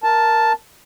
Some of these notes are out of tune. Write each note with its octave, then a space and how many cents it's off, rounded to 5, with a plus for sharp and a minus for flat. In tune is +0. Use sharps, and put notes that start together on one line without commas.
A#4 +5 A5 +0